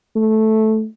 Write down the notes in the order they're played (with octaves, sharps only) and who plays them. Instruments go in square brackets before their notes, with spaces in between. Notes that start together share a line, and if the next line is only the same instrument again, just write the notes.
[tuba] A3